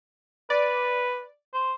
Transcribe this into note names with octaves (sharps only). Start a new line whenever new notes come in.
B4 D5
C5